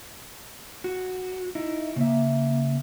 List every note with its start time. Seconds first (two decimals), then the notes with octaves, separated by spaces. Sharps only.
0.84 F#4
1.55 D#4 E4
1.96 C#3 A#3 E5